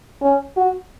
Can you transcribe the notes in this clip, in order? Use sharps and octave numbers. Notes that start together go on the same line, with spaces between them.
C#4
F#4